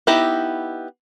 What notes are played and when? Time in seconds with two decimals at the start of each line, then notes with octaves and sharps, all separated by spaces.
0.07 B3 D#4 E4 G4 A#5